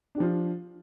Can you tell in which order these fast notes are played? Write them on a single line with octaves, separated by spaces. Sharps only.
D4 G4 F3 F4